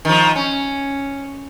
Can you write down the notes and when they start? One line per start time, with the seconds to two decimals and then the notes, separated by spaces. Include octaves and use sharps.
0.05 D#3 F3
0.36 C#4